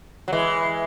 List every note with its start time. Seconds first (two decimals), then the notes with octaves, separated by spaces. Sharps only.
0.28 F#3
0.32 E3 G#3